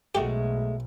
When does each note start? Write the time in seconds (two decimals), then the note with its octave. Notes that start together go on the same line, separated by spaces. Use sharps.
0.15 B1 G#3 A3 F#4 G4